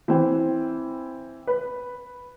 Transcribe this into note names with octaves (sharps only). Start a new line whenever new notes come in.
E3 C4
B4